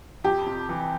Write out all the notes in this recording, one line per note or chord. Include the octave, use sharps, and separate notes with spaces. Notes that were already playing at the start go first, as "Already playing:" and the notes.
F2 G4
C3
E3